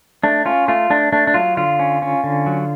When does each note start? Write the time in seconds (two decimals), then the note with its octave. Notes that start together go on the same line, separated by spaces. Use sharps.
0.23 A3 D4
0.45 C#4 F4
0.68 A3 F4
0.90 A3 D4
1.12 A3 D4
1.27 D4
1.34 F#3 F4
1.57 D3 F4
1.79 C#4
2.02 C#4
2.24 D3
2.46 F#3